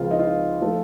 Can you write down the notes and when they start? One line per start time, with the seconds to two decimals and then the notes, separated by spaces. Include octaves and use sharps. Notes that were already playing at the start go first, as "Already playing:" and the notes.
Already playing: C#2 C#3 F3 C4 F4
0.11 D#4
0.19 F4
0.61 F3 A3